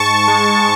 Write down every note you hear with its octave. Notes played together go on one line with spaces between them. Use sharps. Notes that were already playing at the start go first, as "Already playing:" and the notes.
Already playing: G#2 A5 C#6
G#3